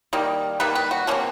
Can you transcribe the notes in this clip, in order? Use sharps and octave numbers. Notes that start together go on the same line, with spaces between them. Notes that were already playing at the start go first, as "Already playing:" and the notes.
D#3 G3 A#3
D#3 G3 A#3 B4
B4
F#4
C3 F3 A#3 C#4